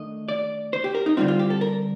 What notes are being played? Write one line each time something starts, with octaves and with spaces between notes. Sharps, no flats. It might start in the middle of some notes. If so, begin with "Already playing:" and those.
Already playing: D#3 A3 D4 D#5
D5
C5
G4
A#4
D#4
D3 G3 C4 F4
F4
G4
A4
A#4